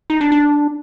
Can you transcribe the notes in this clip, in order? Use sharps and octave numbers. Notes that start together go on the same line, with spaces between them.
D#4
D4
D4